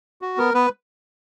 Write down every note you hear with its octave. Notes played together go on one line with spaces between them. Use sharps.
F#4
B3 A#4
B3 B4